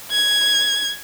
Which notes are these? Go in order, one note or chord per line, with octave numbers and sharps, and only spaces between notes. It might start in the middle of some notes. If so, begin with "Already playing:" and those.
G#6